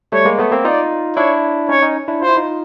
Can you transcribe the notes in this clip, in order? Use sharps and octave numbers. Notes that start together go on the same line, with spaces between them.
G3 A3 C#5
G#3 A#3
A3 B3
A#3 C4
D#4 F4 D5
D4 E4 C#5
C#4 D#4 C#5
C#4 D#4
D4 E4
F4 C5
E4
D#4 F4